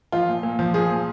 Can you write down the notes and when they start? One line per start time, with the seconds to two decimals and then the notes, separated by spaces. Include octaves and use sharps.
0.12 F3 F4
0.28 A#2
0.43 A#2
0.59 F3
0.74 F3 G#4
0.90 A#2